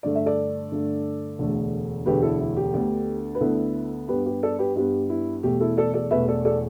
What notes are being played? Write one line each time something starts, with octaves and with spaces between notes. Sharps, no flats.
G2 D3 A3 D5
E5
A4 D5
G2 D3 A3
E1 D2 D3 A3
E1 D2 D3 A3 G4 B4
E4 A4
E4
G4
D2 D3 B3
B4
D2 D3 B3 E4 A4
G2 G3 B3 G4 B4
G4 B4
A4 D5
G4 B4
G2 G3 B3 G4
E4
E1 E2 B2 A3 G4
E4 A4
A4 D5
A4 D5
E1 E2 B2 A3 B4 E5
A4 D5
A4 D5